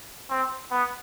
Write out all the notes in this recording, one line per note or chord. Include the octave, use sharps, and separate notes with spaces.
C4
B3